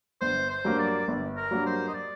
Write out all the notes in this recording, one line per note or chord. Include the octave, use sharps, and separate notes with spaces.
G1 C5
C5
G2 F#3 A#3
D5
G1
A#4
G2 F#3 A#3
C5
D#5
D5